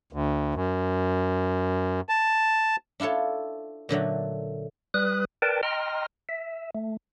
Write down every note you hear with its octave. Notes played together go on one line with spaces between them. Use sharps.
D2
F#2
A5
D4 E4 F4 A4 C#5
A#2 D3 F#3 A3
G3 B4 D#6 F#6
A#4 B4 D5 G5 A5
D#5 G5 A#5 C6 F6
E5
A3